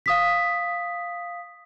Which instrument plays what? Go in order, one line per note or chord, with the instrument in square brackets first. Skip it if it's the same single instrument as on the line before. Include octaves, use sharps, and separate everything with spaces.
[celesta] F5 D#6 B6